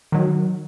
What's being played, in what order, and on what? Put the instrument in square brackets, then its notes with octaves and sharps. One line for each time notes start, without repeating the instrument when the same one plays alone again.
[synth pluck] D#3 F#3